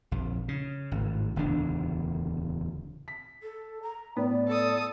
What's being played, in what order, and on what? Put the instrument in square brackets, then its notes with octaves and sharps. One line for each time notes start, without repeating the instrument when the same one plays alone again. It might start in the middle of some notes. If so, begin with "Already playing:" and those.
[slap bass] A#1 F2
C#3
G#1 A2
D1 E2 C#3 D4
[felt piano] B6
[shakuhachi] A4
A#5
[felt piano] A2 B4 [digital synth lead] B3 [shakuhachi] D5
[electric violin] A4 D#6